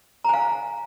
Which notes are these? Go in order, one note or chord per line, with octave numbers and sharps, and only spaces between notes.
F5 G#5 A#5